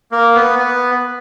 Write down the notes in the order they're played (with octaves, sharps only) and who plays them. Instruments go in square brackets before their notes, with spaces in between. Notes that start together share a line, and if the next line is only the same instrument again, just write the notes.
[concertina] A#3
B3
B3